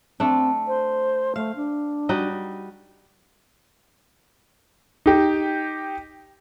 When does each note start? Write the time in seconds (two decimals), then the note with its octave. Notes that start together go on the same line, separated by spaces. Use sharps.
0.20 A3 C4 D4
0.67 C5
1.36 A3 F5
1.56 D4
2.09 G3 D#4 F#4
5.06 D#4 G4